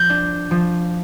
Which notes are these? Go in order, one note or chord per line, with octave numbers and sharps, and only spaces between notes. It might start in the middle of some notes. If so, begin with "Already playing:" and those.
Already playing: F3 G6 A#6
D4
F3